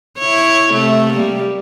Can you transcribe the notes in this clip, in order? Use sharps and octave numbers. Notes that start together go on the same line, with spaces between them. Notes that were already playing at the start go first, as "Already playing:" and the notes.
E4 C#5
C3 A3
G3 A#3